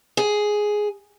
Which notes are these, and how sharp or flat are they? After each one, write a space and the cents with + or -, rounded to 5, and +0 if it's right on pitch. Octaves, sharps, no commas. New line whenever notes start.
G#4 +5